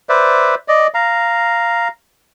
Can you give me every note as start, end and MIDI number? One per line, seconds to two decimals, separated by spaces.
0.09 0.55 71
0.09 0.55 72
0.09 0.55 74
0.09 0.55 76
0.68 0.87 74
0.68 0.87 75
0.94 1.88 77
0.94 1.88 82